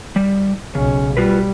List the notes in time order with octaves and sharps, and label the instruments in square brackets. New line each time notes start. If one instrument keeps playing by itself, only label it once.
[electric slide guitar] G3
[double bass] B1 C#4 [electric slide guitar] C#3
[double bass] G3 [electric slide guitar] F4 F#4 B4